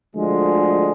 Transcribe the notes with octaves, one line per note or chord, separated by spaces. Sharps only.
D2 D3 F3 G#3